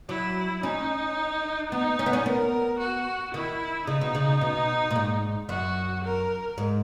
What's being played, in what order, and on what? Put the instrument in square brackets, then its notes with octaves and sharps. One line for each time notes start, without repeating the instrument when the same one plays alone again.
[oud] F#3 [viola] E4
[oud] C#4 [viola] D#4
[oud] B3 [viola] D#4
[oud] C#4
B3
C#4
[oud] B3 [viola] A#4
[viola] F#4
[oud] D#3 [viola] E4
[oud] C#3 [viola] D#4
[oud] B2
C#3
B2
A#2
G#2
[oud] F#2 [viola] F#4
[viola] A#4
[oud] G#2